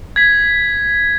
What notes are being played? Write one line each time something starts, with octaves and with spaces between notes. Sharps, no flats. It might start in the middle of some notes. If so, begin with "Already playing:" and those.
G#6 B6